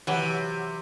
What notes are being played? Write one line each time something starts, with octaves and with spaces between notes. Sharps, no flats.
C3 E3 F#3